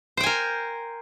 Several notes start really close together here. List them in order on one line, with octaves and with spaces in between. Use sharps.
C5 G5 G#5 A#4